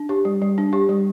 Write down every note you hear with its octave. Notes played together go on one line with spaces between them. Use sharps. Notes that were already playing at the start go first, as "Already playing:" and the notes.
Already playing: D4
G4
G3
G3
D4
G4
G3